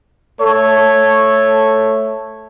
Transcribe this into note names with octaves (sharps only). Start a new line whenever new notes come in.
A3 A4 C#5